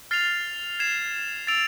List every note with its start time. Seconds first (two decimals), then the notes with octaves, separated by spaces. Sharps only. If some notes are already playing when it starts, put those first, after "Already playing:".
0.11 F6 A6 C7 F7
0.80 G#6 C7 E7
1.47 E6 A6 D7 F7